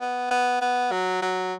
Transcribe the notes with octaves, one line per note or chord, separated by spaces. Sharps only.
B3
B3
B3
F#3
F#3